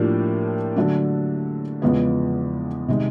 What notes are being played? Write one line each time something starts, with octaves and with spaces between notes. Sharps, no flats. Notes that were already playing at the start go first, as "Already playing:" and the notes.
Already playing: A2 F3 A#3 D4 G4
D3 F#3 A3 D4
E2 C#3 F3 G#3 B3
C3 D#3 G#3